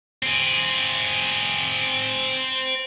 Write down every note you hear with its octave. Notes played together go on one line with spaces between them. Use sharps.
C4 G#4